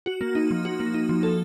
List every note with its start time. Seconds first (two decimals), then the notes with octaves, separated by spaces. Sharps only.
0.06 F#4
0.21 A#3
0.35 D#4
0.51 F3
0.65 F#4
0.80 A#3
0.94 D#4
1.09 F3
1.23 A4